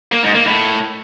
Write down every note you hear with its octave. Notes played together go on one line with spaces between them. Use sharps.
A#3
G#2
A#3
A2